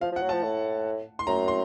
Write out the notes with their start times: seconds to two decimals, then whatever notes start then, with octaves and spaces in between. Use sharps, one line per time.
0.01 F3 F5
0.12 F3
0.16 F#5
0.23 F#3
0.29 F3 A5
0.43 A2
1.19 C6
1.27 F#2 A#5
1.48 C6